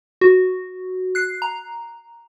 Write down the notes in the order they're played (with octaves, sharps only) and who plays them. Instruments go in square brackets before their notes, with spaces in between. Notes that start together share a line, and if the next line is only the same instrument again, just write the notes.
[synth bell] F#4
F#6 C7
A#5